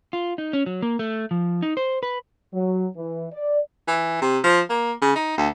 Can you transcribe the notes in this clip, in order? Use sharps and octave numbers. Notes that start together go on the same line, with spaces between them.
F4
D#4
C#4
F#3
A#3
A3
F3
D#4
C5
B4
F#3
E3
D5
E3
C3
F3
A#3
C#3
D#4
D2